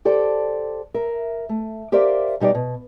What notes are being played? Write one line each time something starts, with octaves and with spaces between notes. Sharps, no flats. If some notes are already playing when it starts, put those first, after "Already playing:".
G4 A4 C5 D5
A#4 E5
A3
G4 A#4 C5 D5 E5 F5
B2 G3 D#4 G4 D5
B2